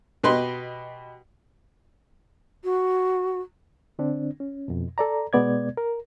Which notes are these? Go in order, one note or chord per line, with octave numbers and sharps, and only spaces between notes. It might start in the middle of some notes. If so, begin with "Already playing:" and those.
B2 G4 B4 D#5 C6
F#4
D3 C4 D4
C#4
F2 B2
A4 D5 A#5
B2 G#3 B3 D5 G#6
A#4